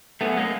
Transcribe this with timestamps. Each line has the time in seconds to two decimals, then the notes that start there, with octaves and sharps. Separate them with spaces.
0.21 F#2 A3 B3
0.37 G#3 A#3